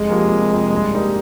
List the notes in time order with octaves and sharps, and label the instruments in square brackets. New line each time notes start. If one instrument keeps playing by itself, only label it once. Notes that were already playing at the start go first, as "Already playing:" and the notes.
Already playing: [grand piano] F1 [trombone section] G#3
[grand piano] F2 C3 F3 A#3
F1
F2 C3 F3 A#3
G2
G3 A#3 D#4 A#4